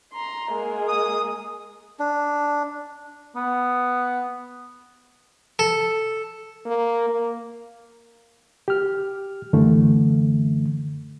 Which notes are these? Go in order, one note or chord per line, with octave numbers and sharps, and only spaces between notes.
A#5 C6
G#3 A#3
D#6
D4
B3
A4
A#3
A#3
G4 F6
F#2 D3 E3 A3